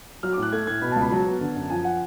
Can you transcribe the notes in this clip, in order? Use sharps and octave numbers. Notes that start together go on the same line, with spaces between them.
F#3 F6
A2 D6
F#6
A3 G#6
A2 G#6
B2 B5
C#2 A5
B5
F#3 A5
B3
D3
F#2
F3 G#5
F#5